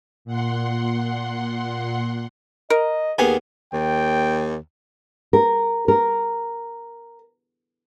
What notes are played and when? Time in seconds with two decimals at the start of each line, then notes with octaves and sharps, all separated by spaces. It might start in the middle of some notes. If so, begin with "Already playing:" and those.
0.25 A#2 F#5 C6
2.70 A#4 D#5
3.18 D#2 B3 G#4 F5 G#5
3.73 D#2 G5
5.33 A#4
5.88 A#4